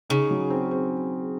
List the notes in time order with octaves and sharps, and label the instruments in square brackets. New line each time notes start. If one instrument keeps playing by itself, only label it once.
[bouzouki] C#3 [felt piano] D#4
[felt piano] F#3
C4
C4